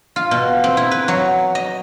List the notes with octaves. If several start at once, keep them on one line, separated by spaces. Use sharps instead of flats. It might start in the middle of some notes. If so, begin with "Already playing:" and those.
F4
B2
C4
E4
B4
F#3
D#5